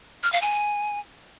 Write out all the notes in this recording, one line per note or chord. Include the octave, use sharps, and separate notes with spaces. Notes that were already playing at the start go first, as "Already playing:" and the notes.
F6
F5
G#5